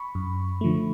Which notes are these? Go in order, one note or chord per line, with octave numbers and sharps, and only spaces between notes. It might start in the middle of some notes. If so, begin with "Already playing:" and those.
Already playing: B5 C#6
F#2
D3 F3 A3